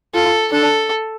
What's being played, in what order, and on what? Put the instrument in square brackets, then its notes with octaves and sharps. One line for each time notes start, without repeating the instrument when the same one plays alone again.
[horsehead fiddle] F4 [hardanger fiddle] A4
[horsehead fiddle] D4 [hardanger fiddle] A4